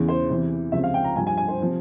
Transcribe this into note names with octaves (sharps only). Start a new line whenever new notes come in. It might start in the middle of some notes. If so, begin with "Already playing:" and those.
Already playing: E2 C#3 E3
C5
E2 C3 E3
C#2 C3 F3 E5
F5
G5
A#5
G2 F3 G#5
G#5
G#5
C5
C3 F3